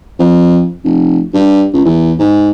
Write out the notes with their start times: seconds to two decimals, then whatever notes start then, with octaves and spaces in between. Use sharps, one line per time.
0.19 F2
0.84 F1
1.34 G2
1.73 C#2
1.85 E2
2.19 G#2